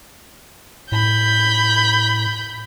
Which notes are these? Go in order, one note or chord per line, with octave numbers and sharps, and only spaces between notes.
A2 B5 G6